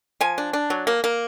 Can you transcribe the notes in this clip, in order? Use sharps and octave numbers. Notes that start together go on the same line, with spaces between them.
F3 G#5
D4
D4
F#3
A#3
A#3